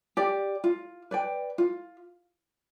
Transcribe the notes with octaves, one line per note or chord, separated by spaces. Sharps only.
G4 D5 G5
F4
B4 D5 G5
F4